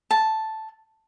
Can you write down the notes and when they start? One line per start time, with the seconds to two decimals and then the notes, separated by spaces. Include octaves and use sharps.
0.11 A5